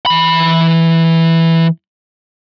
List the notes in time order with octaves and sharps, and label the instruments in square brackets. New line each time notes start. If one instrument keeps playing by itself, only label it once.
[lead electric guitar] E3 B5